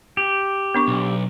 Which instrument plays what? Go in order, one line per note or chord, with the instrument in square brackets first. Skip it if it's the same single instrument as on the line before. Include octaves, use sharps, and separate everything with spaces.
[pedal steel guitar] G4
[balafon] B3 D4 C#6
[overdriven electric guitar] B1